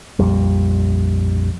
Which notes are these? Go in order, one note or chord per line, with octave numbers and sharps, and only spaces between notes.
A#1 F2 G3